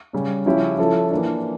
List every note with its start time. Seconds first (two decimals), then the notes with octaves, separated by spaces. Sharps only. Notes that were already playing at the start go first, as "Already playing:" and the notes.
0.13 C#3 G3 C#4
0.46 C#3 F3 C#4 E4 G4
0.78 F3 C#4 E4 A4
1.11 E3 A#3 D4